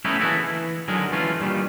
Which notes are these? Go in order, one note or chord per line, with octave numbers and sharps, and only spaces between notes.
A3 B3 C#4 D#4 E4
E3 A#3 E4 F#4 G#4 A4
E3
D3 D#3 F#3 G#3 G#4 A#4
E3 G#3 A3 C#4 F4
G2 A#2 D#3 G3